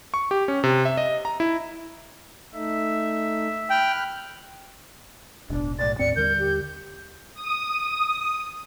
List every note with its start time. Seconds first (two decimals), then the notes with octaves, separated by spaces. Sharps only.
0.14 C#6
0.31 G4
0.48 C#4
0.64 C3
0.85 E5
0.97 D#5
1.25 A#5
1.40 E4
2.54 A3 D#4 E5
3.70 G5 B5 F6 F#6
5.50 E1 A1 B2 D4
5.79 B1 A2 D5 A6
5.99 D#2 A2 C4 D5 C#7
6.16 D#2 D3 G3 A#4 G6
6.39 G4
7.34 D#6